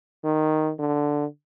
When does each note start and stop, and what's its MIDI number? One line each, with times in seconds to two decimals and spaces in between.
0.24 0.71 51
0.79 1.25 50